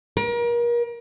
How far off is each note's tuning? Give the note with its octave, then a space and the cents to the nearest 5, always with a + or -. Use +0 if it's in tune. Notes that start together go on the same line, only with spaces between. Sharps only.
A#4 +35